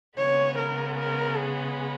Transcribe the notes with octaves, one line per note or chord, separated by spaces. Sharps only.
C#3 G#3 B3 C#5
A#4
A#4
G#4